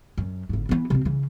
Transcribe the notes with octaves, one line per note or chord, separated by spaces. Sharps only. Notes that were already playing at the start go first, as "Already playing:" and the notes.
F#2
G1 G#2
E3 B3
C3 C4
C#3 E3